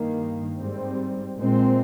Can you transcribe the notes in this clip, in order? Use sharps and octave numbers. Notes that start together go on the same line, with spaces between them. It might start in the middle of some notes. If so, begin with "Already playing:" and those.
Already playing: G2 D#3 A#3
G#2 G3 C4
A#2 G#3 C4